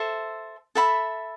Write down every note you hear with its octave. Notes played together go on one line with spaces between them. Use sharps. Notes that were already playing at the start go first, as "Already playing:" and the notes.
Already playing: A4 C5 E5
A4 E5 B5